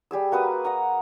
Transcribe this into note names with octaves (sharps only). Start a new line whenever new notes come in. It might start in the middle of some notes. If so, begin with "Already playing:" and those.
G3 G4 G#4 E6
A#3 F#4 B4 D#6
D#5 F#5 A#5